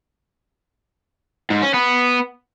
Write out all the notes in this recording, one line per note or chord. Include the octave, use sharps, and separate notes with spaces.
G#2
C#4
B3